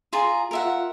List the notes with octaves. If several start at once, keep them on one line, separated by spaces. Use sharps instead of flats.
F4 G#4 A#5
F4 A#4 E5 F#5